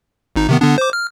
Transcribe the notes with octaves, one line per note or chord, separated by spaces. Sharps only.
G#1 D#4
C3 D#3 B3
D3 B3 D4
C5 D6
F6